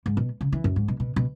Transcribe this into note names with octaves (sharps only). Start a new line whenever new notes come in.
G#2
B2
C#3
E3
F#2
G#2
B2
B2
B2